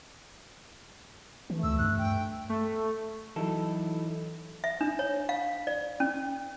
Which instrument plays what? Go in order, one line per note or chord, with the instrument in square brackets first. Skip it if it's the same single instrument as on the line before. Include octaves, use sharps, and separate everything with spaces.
[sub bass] E3 [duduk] A3
[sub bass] D2 [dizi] E6
[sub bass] G2 [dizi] F#6
[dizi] G5
[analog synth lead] A3
[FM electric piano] E3 F#3 [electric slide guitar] D#4 E4 A4
[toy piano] E5
D4
C#5
F5
D5
C#4